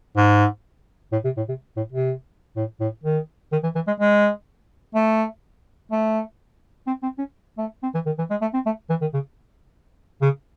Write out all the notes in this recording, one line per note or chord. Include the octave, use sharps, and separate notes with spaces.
G#2
A2
C3
A2
C3
A2
C3
A2
A2
D#3
D#3
E3
E3
G#3
G#3
A3
A3
C4
C4
C#4
A3
C4
E3
D#3
E3
G#3
A3
C4
A3
E3
D#3
C#3
C#3